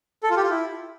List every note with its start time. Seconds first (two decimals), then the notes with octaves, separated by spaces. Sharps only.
0.23 A4
0.30 F4
0.37 G4
0.44 F4
0.50 E4